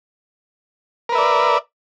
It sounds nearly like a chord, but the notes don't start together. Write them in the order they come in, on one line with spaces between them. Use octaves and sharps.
A#4 B4 E5 D5